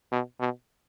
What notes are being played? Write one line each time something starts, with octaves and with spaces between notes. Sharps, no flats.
B2
B2